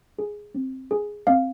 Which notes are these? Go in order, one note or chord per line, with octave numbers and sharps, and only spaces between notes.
G#4
C4
G#4
C4 F5